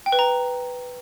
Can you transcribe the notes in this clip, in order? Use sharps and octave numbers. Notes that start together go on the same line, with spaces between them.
G5
B4
A#5